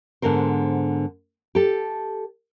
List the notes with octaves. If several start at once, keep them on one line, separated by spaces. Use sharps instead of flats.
G#2 D3 B3 A#4 C5
G4 A4